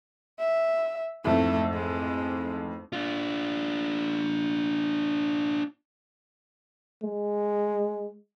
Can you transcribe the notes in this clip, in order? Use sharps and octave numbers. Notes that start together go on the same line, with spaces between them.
E5
A1 F2 G#2 A3
G#3
D4 F4
G#3